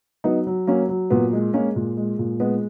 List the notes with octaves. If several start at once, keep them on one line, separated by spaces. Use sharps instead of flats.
F#3 B3 D#4
F#3
F#3 A#3 C#4
F#3
A#2 B3
G#3
G#3 A#3 C#4
A#2
G#3
A#2
G#3 B3